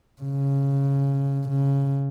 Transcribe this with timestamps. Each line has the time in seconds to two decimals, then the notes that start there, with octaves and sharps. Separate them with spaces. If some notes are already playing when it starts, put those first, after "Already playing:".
0.22 C#3
1.49 C#3